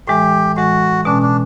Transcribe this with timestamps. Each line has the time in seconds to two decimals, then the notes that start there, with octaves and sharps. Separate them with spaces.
0.07 A2 E3 G#3 G4
0.57 A2 E3 G#3 F#4
1.05 B2 G#3 C#4 D4
1.22 D4